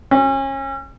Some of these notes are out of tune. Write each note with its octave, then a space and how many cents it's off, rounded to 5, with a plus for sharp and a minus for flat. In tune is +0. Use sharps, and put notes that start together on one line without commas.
C#4 -30